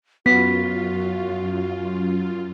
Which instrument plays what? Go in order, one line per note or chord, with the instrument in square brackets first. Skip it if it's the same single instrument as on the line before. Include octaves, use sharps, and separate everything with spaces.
[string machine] F#2 F4 [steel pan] B3 [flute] F#4 [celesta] B6